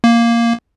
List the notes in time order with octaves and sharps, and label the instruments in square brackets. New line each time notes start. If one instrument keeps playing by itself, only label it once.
[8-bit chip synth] A#3